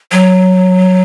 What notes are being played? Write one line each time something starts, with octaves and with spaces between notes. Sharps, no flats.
F#3